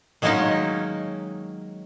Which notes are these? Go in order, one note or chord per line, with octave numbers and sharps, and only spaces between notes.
D#3 F#3 G#3 A#3 C#4 D#4